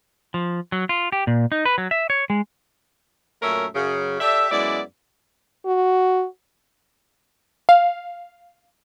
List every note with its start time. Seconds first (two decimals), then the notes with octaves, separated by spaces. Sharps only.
0.34 F3
0.72 F#3
0.89 F4
1.12 G4
1.27 A#2
1.52 D#4
1.65 B4
1.78 F#3
1.91 E5
2.10 C#5
2.30 G#3
3.42 F#2 A#2 A3 C#4 A#4 E5
3.74 F#2 C#3
4.19 G4 A4 D5 E5
4.51 F#2 G#3 B3 E4 D5
5.66 F#4
7.69 F5